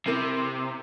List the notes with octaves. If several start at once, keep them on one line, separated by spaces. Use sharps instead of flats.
C3 E4 A#4